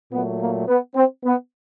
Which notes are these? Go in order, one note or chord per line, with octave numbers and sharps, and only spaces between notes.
A#2 F#3 A3 B3
A#3
B3
C4
B3